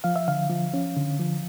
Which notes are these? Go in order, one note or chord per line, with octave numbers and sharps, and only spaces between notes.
F3 F5
E5
D3 F5
F3
C#4
D3
F3